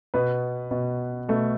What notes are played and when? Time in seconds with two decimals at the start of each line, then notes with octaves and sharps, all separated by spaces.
0.14 B2 B3 B4
0.71 B2
1.29 B2 A3 A4